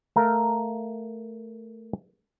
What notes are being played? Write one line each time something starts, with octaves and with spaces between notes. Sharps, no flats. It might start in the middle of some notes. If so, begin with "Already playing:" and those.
A3 A#4 F5